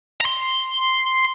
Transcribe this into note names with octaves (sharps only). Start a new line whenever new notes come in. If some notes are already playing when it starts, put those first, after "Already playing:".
A#5 C6